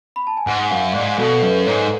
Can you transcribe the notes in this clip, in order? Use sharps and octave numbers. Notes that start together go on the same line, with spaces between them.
B5
A5
G#5
G#2 F#5
F#2 F5
G#2 D5
B2 A4
F#2 B4
G#2 C#5